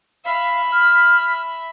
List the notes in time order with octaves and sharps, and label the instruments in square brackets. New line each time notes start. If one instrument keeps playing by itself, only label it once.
[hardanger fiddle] E5 B5 [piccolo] F5
[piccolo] F6